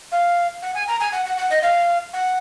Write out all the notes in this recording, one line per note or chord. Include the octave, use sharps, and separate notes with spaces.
F5
F#5
G#5
A#5
G#5
F#5
F#5
F#5
D#5
F5
F#5